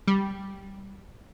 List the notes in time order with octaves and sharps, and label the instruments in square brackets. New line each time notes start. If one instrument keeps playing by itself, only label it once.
[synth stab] G3